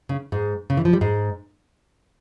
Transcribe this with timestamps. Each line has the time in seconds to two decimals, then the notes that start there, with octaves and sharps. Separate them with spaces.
0.09 C#3
0.32 G#2 G#3
0.70 C#3
0.77 E3
0.85 F3
0.93 G3
1.01 G#2 G#3